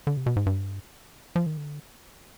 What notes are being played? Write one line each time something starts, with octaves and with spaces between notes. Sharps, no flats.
D3
C3
B2
G#2
G2
F3
D#3
D3